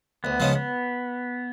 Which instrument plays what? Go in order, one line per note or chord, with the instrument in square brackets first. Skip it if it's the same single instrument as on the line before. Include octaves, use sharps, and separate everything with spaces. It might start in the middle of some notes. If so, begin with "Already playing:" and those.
[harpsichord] D2 [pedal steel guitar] B3
[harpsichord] C#3 F3 G#3 C#4
[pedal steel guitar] B3